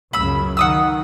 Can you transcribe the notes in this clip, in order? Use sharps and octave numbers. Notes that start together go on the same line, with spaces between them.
C#2 F#2 C#3 B5 E6
D#3 F#5 D#6 E6